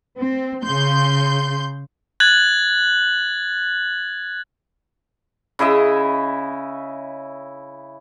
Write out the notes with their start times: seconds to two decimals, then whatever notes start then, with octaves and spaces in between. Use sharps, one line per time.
0.16 C4
0.64 C#3 C6 G6
2.20 F#6 G#6 A6 F#7
5.59 C#3 E4 D#5 E5